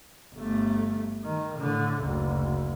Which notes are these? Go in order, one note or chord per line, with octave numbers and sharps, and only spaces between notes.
G1 A3
D#3
A2 D3
F#1 D2